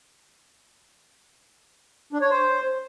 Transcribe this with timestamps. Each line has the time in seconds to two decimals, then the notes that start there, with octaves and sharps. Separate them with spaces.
2.13 D4
2.21 C#5
2.30 C5